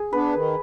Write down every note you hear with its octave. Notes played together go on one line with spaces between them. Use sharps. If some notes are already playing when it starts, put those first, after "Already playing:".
Already playing: G#4
B3 D4 B4
D#3